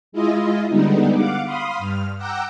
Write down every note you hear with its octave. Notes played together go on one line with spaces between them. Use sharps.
G#3 E4 F4 D#5
D3 G3 G#3 B3 D#4
F5 F#5 D6
F5 B5 C6 D#6
G2 F6
F#5 G5 A#5 D6 E6 F#6